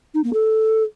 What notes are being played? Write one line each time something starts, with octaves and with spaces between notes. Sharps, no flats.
D#4
A#3
A4